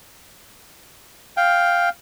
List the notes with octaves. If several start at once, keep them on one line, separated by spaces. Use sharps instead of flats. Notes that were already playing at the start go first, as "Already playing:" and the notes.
F5 G5